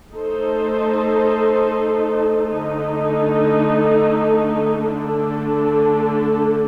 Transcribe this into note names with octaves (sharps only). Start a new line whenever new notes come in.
A3 D#4 A4 C5
D3 A3 D#4
D3 A3 D4 A4